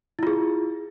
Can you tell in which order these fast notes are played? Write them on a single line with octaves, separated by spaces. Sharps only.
E4 F4 G#4